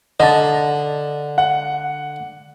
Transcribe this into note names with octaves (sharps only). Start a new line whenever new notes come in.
D3 D#5 A5
F#5